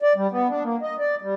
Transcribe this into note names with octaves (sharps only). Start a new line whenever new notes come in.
D5
G3
B3
D4
A#3
D#5
D5
G3